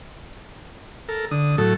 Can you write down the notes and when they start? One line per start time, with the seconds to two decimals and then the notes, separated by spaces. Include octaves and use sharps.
1.09 A4 A#4
1.31 D3 D#6
1.58 A2 F#3 A4